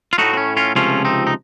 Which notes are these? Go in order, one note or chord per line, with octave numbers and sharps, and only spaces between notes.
F4
A2 A3 D#4 F#4
C4
C#4
C#4 F4
C#2 C3 F3 A3 C#4 F4
C4 D#4
D#4